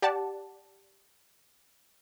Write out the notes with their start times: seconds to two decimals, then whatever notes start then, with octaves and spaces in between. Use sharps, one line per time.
0.02 G4 D5 F#5 A5